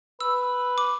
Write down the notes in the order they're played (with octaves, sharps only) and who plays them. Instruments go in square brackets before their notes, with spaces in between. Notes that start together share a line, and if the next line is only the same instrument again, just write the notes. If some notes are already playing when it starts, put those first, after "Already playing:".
[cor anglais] B4 [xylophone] E6
[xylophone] D6